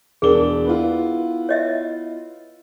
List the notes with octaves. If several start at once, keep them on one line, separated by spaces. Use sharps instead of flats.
E1 D4 G#4 A#4 G7
B3 E4 F4
C#5 D#5 E5